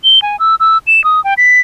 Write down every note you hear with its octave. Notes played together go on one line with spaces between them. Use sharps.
G7
G#5
E6
E6
E7
D#6
G5
B6